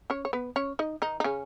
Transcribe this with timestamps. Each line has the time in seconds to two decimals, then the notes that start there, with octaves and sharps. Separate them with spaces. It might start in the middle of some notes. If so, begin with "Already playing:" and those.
0.10 C#4 C#5
0.25 C#5
0.33 B3 B4
0.56 C#4 C#5
0.79 D#4 D#5
1.02 D#3 D#4
1.20 D#4
1.24 C#3 C#4